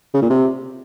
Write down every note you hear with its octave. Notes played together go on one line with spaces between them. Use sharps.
C#3
A#2
C3